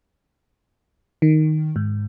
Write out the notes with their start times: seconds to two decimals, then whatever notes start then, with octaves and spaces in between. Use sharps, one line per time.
1.22 D#3
1.76 G#2